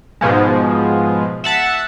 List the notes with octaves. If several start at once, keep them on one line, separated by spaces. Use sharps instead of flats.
G#2 B2 F3 G#3
E5 F#5 A5